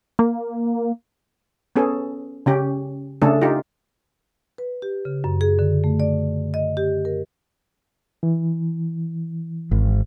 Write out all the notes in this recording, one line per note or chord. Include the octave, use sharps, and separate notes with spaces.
A#3
B3 C#4 G#4 A4
C#3 C#4 G4
C#3 A3 D4 G#4 A4
D#4 F4 G4
B4
G4
C#3
F#2
G#4
D3
A3
D5
D#5
G4
A#4
E3
G#1